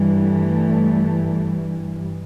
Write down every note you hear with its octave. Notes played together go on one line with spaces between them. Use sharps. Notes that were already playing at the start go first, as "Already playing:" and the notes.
Already playing: G2 E3 G3
A3